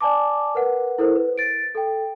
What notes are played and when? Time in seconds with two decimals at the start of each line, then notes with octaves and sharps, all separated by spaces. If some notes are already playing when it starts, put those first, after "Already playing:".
0.01 D5 G#5 A5 D6
0.55 A#4 B4 F#5
0.98 E4 A4 A#4 C5
1.16 B4
1.38 A6 D7
1.75 A4 G5